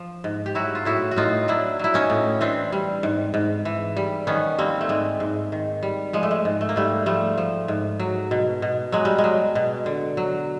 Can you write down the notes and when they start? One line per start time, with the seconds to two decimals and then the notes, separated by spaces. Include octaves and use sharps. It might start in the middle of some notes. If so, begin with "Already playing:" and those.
Already playing: F3
0.24 G#2
0.46 G4
0.55 F#3 E4 F#4
0.75 F4
0.85 A2 E4 F#4
1.11 F#4
1.17 A2 D#4 F4
1.48 F#3 D4 E4
1.79 F#3 E4
1.94 C#4 D#4
2.10 A2
2.41 E3 C4 D4
2.72 G3
3.03 G#2
3.34 G#2
3.65 E3
3.97 G3
4.27 D#3 B3 C#4
4.59 G3 A#3 C4
4.81 A3
4.89 G#2 G#3
5.20 G#2
5.52 D#3
5.83 G3
6.13 F3 G#3
6.23 A3
6.31 G#3
6.45 G#2
6.61 A3
6.69 A#3
6.76 G#2 G3 A3
7.06 F3 G3 A3
7.38 F3
7.68 G#2
8.00 F#3
8.31 B2
8.62 B2
8.92 F#3 G#3
9.05 G3
9.18 G#3
9.24 F#3
9.55 B2
9.86 D3
10.17 F#3